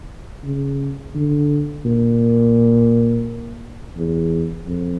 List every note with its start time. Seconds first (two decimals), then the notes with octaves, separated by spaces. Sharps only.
0.44 C#3
1.15 D3
1.85 A#2
3.97 E2
4.67 F2